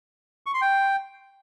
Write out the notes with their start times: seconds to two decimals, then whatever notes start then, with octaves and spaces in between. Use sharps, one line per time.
0.46 C#6
0.54 C6
0.62 G5